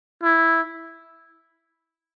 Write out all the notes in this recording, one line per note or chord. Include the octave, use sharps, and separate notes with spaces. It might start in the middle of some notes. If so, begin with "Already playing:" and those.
E4